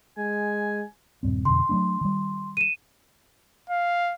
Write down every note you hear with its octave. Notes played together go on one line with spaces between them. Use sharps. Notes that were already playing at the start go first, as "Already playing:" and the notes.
G#3 G#5
D#1 G2 C4
F2 B2 D3 C6
F#3 A3 D4
D#3 G3
D#7 E7
F5